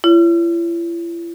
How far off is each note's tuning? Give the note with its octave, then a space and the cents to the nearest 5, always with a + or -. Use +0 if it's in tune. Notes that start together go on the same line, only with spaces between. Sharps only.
E4 +45 C#5 +30